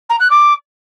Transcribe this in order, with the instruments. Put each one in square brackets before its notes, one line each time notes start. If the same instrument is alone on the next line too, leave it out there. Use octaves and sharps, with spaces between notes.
[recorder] A#5
F#6
D6